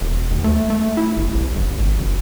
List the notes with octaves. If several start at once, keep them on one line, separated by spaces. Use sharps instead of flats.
E1
D#2
A3
A3
E4
G1
C2
G1
G#1
F#1